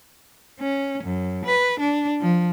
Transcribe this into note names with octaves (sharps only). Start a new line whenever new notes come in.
C#4
F#2
B4
D4
F3